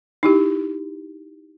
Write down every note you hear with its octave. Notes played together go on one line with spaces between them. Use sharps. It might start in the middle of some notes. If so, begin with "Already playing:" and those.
D#4 E4 G4